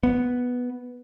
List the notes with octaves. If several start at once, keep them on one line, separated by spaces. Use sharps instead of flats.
B3